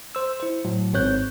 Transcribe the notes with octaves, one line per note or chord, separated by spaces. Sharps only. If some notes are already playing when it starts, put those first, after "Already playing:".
C5 E6
E4 C5
A2 F#3
G#1 G#2 C4 C#5 F#6 G6